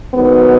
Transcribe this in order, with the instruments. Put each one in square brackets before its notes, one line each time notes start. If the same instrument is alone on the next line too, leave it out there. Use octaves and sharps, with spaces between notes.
[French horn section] G#2 D#3 F#3 B3